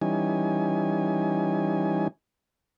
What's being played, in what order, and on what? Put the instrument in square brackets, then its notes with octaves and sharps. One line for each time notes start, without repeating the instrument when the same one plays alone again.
[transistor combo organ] E3 G3 C#4 D#4 G#5